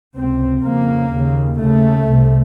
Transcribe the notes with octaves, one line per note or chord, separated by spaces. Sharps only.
C#2 C3 C4
F2 C#3 A#3
D#2 C#3
D#2 C#3 A3
C2 C3